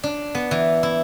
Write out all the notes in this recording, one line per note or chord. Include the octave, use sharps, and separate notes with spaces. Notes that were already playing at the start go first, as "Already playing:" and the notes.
D4
B3
E3
E4